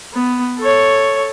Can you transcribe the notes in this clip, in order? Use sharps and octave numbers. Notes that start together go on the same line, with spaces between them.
B3
A4 C#5